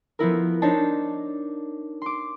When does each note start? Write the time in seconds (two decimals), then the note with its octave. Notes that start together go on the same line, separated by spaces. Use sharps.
0.19 F3 B3 E4 A#4
0.62 D4 D#4 C5 C#5 A5
2.02 C6 D6